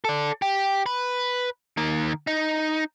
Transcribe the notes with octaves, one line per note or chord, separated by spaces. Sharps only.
A4 D5
G4
B4
D#3 A#3
D#4